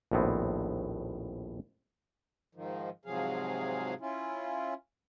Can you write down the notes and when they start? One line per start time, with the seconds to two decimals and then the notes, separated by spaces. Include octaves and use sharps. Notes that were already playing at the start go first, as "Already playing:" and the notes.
0.12 A#1 D#2 A2 B3 C4
2.55 G#2 D#3 F3
3.05 G#2 C3 F3 F#3 G#4 F5
4.01 C#4 E4 F4